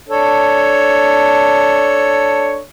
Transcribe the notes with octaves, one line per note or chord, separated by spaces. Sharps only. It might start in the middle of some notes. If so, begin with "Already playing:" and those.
D4 A4 C#5